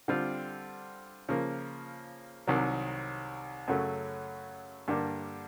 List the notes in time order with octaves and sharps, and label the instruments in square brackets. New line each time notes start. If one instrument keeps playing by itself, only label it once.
[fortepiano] D3 G3 C4 F4
C#3 F3 A#3
C2 C3 D#3 F#3
F#2 C#3 F#3 A3
G2 D3 G3 A#3